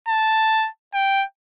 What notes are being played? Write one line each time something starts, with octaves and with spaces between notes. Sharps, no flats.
A5
G5